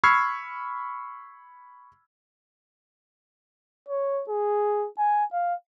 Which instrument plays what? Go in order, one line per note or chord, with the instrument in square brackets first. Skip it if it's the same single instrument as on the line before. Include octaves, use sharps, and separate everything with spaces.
[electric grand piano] B5 C#6 E6 F6 G#6 C7
[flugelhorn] C#5
G#4
G#5
F5